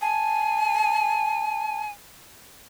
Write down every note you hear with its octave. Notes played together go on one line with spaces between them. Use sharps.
G#5 A5